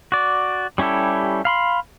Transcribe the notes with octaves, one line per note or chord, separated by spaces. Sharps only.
F#4 D5
G3 C#4 E4 G4 A4
F5 B5 C6